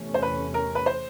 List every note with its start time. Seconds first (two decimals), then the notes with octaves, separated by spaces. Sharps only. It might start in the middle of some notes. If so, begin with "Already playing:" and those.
Already playing: E2 C3 E3 A3 C#4
0.14 C5
0.22 B4
0.54 A#4
0.75 B4
0.86 C5